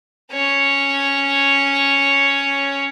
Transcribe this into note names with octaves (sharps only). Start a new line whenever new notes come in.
C#4 C#5